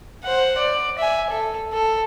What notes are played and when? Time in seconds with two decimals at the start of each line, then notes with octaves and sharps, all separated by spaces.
0.24 C5 F#5
0.58 D5
0.99 E5 G#5
1.30 A4
1.74 A4